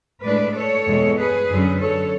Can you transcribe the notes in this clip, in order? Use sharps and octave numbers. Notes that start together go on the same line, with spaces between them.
A2 G#3 D4 B4 D5
A4 C#5
E2 B2 G#3
G#4 B4
F#2 D3 F#3 C#4
A4 C#5